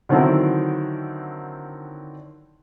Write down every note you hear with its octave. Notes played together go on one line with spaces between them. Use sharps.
D3 D#3 F#3 C4 E4 A4